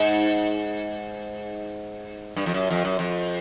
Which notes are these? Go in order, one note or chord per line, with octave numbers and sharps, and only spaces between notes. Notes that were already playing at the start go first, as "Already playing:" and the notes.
Already playing: G#2
G2
F2
F#2
F2
F#2
F2